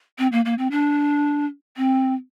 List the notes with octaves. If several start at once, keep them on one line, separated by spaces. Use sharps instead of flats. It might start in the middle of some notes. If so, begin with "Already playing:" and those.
C4
A#3
A#3
C4
D4
C4